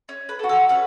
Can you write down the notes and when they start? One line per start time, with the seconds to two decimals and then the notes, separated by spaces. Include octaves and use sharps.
0.09 C#4
0.29 B4
0.39 A4
0.44 F#4
0.49 A4
0.69 C#4 B4